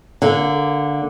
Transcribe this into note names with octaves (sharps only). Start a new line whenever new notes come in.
D3 A#3